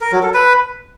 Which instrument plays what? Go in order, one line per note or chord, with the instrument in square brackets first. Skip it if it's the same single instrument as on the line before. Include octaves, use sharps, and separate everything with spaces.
[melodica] A#4
F#3
A4
B4